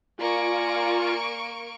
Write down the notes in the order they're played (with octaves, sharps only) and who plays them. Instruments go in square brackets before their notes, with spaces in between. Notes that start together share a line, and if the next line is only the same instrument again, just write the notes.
[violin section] A#3 C#6 D7 [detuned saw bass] F4 [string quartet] D5 G#5 A#5